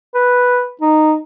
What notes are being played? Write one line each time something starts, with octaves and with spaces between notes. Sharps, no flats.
B4
D#4